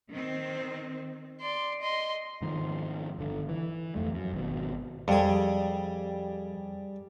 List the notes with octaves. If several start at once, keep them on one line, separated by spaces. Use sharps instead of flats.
D#3 C4
D5 C6
D#5 C6
G#2 D#3 F3
G1 D3
E3
F2 A3
F#2
G#1 B2
F2 G3 G#4